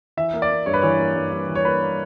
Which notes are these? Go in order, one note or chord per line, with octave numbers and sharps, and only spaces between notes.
E3 E5
A#3
D5
A#3
G2 C#5
B4
E3 C#5
A#3
G2
G2
E3
C#5
A#3 B4
A#3